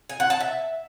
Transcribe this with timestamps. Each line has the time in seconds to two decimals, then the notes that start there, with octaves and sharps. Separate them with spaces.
0.09 G#5
0.20 F#5
0.30 A5
0.40 E5